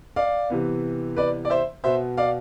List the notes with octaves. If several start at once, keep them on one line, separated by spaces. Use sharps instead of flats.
D5 F5
C3 E3 B3
B4 D5
D5
C5 E5
B2 B3 C5 E5
D5 F5